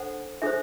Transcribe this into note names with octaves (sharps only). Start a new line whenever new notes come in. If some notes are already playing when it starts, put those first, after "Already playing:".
Already playing: D4 A4 C5 F#5
D4 A4 C5 E5